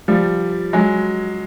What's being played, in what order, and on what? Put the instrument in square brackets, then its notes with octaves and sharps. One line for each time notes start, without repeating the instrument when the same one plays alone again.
[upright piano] F3 G3
F#3 G#3